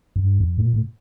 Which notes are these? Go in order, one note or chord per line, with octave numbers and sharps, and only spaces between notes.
F#2
G2
F2
A2
A#2
A2